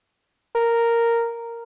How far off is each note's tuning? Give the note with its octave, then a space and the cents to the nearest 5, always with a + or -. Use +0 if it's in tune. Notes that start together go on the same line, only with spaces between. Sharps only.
A#4 -5